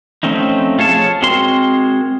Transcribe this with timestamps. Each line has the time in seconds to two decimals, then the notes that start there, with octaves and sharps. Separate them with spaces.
0.23 F3 A3 C4 C#4 D#4
0.79 F4 G#4 C#5 A5
1.22 G#3 C4 F#4 A#4 C6